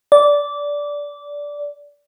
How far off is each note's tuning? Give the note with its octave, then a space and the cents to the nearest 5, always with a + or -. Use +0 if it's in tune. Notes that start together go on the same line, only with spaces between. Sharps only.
D5 -15